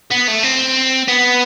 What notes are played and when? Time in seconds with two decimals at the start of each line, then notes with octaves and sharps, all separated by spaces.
0.11 B3
0.28 A3
0.43 C4
1.08 B3